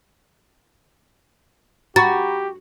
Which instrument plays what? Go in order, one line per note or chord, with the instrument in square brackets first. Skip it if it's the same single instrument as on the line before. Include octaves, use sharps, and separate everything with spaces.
[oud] F#4 [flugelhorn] G4 [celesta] A#5 B5 C#6 [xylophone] A6